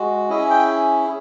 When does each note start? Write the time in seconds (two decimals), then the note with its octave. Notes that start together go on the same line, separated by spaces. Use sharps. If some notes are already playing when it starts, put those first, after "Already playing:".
Already playing: G#3 F#4
0.29 C#4 E4 G#4 D#5
0.50 G5